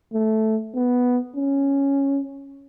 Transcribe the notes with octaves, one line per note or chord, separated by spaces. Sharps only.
A3
B3
C#4